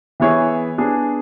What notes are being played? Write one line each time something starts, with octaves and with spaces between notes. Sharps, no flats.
E3 B3 E4 G#4 C#5
B3 D4 G#4